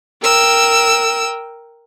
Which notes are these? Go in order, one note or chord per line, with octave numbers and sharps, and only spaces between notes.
A#4 G5 E6